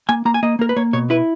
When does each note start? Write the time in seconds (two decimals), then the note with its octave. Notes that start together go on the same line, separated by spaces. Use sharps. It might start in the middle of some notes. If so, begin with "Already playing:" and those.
0.09 A#3 G#5
0.25 A#3 A#5
0.34 G#5
0.43 A#3 D#5
0.59 A#3 A#4
0.69 B4
0.76 A#3 C#5
0.93 B2 C#5
1.10 E4 B4